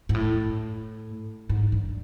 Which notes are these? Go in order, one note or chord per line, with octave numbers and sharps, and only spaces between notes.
G#2
A2
G#2
G2